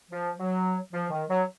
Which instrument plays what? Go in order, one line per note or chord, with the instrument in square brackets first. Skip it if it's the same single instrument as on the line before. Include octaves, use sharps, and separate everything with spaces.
[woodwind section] F3
F#3
F3
D#3
F#3